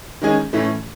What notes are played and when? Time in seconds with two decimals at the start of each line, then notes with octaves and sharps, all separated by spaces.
0.22 D#3 G#3 C#4 G#4
0.53 A2 E3 A3 C#4